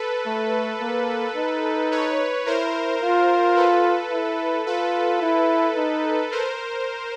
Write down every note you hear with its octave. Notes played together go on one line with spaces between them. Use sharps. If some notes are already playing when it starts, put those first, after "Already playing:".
Already playing: A4 B4
A3
A#3
D#4
B4 C#5
E4 A#4 C5
F4
A4 B4
E4
F4 A4 B4
E4
D#4
A#4 C5